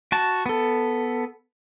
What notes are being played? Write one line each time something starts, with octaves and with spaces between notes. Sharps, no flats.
F#4 A5
B3 A4